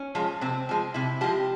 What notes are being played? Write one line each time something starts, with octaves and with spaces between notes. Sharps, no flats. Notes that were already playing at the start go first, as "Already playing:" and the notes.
Already playing: C#4
F3 G#3
C3 C4
F3 G#3
C3 E4
F3 G#3 G4